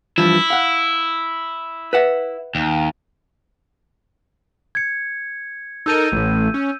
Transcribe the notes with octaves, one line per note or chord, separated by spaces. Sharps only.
G2 E3 F3 E4
F5 F#5
B4 E5 F#5
D#2
G#6 C#7
D#4 A4 A#4 E6 G6 D#7
A1 A2
C#4